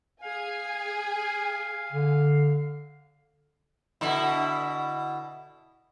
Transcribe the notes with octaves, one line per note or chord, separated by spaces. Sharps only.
G#4 F5 G#5
D3
B2 D3 E4